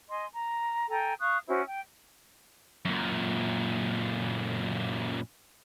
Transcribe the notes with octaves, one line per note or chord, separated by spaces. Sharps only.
D#5 G#5 C6
A#5
A4 G5 G#5 A#5
F5 C#6 D#6 F#6
C#4 E4 F#4 C5
G5
F#2 A#2